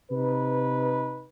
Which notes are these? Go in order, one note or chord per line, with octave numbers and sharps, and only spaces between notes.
C3 D#4 B4